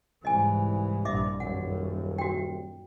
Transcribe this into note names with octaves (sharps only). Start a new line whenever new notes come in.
C2 G#2 E3 D#5 G#5
A#1 G2 D#5 E5 D6
D#1 F#2 F#5
F#4 G5